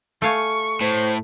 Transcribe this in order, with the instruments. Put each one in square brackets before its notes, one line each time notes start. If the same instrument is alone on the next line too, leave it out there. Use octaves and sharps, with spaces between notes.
[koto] A3 F5 G#5 [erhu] C#6
[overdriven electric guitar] A2 [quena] C5